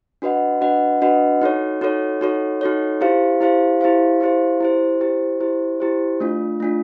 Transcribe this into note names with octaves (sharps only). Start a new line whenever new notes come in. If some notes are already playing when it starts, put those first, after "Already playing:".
D4 F#4 B4 D#5 F#5
D4 F#4 B4 D#5 F#5
D4 F#4 B4 D#5 F#5
D#4 F#4 A4 C#5
D#4 F#4 A4 C#5
D#4 F#4 A4 C#5
D#4 F#4 A4 C#5
E4 G4 C5 F5
E4 G4 C5 F5
E4 G4 C5 F5
E4 G4 C5 F5
E4 G4 C5
E4 G4 C5
E4 G4 C5
E4 G4 C5
A3 D4 F4
A3 D4 F4